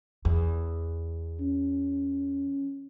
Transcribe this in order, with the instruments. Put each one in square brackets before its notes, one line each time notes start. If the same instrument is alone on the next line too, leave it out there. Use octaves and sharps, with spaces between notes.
[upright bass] E2
[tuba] C#4